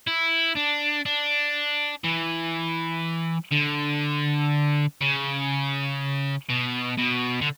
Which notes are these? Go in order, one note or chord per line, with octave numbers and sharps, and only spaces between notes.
E4
D4
D4
E3
D3
C#3
B2
B2
D3